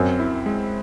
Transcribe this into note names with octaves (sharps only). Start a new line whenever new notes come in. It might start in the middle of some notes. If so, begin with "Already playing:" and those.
Already playing: F#2 C4
E4
G#3